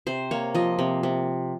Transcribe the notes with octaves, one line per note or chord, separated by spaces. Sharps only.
C3 C5
A#3 C#5
F3 D#5
C3
C3